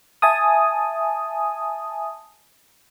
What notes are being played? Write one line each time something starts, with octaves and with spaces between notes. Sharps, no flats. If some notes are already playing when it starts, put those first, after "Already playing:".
E5 G#5 A5 D#6